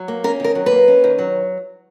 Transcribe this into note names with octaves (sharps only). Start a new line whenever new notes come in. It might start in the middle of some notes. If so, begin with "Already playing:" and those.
Already playing: F#3
A#3
C#4 A#4
D#3 A#4
F#3
B4
A#3
C#4
D#3
F#3